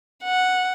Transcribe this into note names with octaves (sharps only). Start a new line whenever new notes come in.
F#5